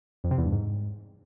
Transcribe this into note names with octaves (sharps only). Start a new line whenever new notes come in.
F2
C3
E2
G2
G#2